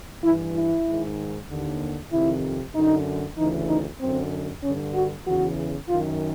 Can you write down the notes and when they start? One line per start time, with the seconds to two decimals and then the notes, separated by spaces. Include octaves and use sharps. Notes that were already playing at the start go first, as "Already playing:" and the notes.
0.24 G2 E3 E4
0.54 E4
0.86 G#2 D#3
1.48 D#2 D3
2.11 F2 C3 D#3 E4
2.74 F#2 D3 D#4
3.37 D2 C#3 E3 D#4
3.68 D#4
4.00 F#2 D3 C4
4.63 G2 D3 C#4
4.94 F#4
5.25 E2 C#3 E3 F#4
5.88 F#2 D#3 F4